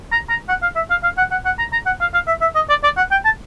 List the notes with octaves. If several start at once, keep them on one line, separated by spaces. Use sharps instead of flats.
A#5
A#5
F#5
F5
E5
F5
F5
F#5
F#5
F#5
A#5
A#5
F#5
F5
F5
E5
E5
D#5
D5
D5
F#5
G5
A5